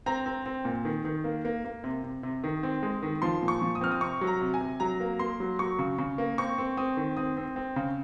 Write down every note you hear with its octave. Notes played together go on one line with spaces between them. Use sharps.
C4 A#5
C4
C4
A#2
D#3
D#3
A#3
A#3
A#3
C3
C3
C3
D#3
C4
G#3
D#3
F3 C6
A#2
C#6
F3
D#6
C4 F6
D#6
C3 C#6
F#3
A#5
C3
G#5
C3
F#3 A#5
A#3
A#3 C6
F#3
F#3 C#6
C#3
C#3
A#3
C4 C#6
C4
C4 D#6
D#3
C4 D#6
C4
C4
C#3